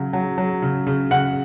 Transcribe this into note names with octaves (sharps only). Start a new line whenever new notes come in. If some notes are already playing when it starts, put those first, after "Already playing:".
Already playing: C#3 F#3
F#3
F#3
C#3
C#3
C#3 F#5